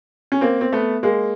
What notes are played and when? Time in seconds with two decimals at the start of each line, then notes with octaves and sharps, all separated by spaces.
0.32 C#4
0.41 A#3 C4
0.61 C4
0.73 A3 B3
1.03 G#3 A#3